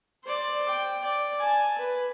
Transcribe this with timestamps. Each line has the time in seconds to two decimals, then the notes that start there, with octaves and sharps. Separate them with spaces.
0.24 C5 D5
0.69 G5
1.03 D5
1.39 G#5 A5
1.78 B4